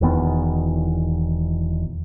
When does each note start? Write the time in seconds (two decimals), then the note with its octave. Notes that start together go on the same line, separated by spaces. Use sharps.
0.01 E1 E2 D#3 B3